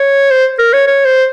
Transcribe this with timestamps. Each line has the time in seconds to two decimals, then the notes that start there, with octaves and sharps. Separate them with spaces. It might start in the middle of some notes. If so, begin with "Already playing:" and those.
Already playing: C#5
0.31 C5
0.59 A#4
0.73 C#5
0.87 C#5
1.05 C5